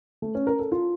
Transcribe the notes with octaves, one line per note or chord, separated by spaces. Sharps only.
A3
C#4
A#4
A4
F4